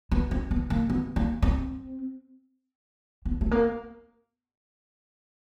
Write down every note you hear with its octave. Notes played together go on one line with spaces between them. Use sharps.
B3
C4
B3
A#3
B3
A#3
C4
B3
A3
A#3